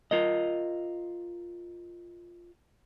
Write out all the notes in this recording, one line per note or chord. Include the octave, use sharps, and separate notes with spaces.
F4 A#4 D#5